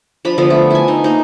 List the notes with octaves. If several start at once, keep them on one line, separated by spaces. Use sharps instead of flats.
F3 D4 B5
D3 F3 B3
A3
E4 G#5
D#4
A#3 D#4